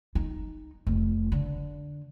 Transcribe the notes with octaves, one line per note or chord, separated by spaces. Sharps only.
D#4
F1
D3